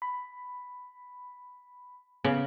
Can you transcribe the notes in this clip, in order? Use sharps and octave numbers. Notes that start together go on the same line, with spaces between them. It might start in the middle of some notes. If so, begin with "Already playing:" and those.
B5
C#3 B3